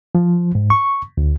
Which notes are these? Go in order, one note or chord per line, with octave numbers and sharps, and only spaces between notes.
F3
G#2
C#6
D2